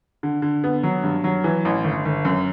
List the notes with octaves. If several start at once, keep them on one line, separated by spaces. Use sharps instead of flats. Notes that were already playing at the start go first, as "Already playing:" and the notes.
D3
D3
B3
F#3
G2
F#3
E3
A1
G1
G1
F#2